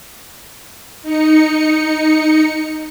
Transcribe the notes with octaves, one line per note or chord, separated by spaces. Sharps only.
D#4 C#7